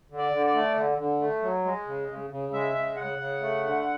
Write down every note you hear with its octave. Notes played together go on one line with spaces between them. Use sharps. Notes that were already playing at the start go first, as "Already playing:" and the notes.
D3
D5
D3
D5
A3
D3
D3
A3
F#3
G#3
C#3
C#3
C#3
G#3 E5
C#3
C#3 F#5
C#3
A3
D3